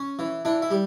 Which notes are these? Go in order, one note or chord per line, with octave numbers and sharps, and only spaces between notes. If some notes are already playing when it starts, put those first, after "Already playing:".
Already playing: C#4
E3
E3 D4
E4
G3